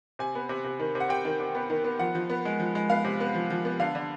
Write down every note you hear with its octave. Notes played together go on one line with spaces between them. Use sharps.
C3 G#5
B3
C3
C3
D#3
C3
F#5
C3 G5
D#3
C3
B3
D#3
B3
F3 F#5
F3
B3
G#3
F3
G#3
B3 F5
C3
B3
F3
F3
B3
D3 F5
D3